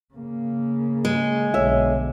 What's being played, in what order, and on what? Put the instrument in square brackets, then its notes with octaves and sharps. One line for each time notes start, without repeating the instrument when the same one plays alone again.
[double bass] C#3 A#3
[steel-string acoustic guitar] G#3
[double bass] B1 D3 [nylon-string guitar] C#5 E5